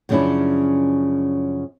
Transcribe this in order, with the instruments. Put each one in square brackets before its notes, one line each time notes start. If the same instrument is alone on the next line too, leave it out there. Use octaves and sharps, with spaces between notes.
[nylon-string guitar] F#2 C#3 F3 C#4 D4 E4